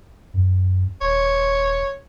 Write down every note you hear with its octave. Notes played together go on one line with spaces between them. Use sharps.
F#2
D#1 C#5